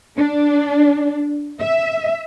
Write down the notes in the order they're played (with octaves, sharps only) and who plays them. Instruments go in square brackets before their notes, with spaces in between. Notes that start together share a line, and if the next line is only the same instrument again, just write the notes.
[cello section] D4
E5